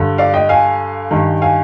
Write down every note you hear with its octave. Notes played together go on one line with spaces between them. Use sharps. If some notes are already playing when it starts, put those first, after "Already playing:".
Already playing: G2 D3
D5 F5
D#5 G5
F5 G#5
G2 D#3
F5 G#5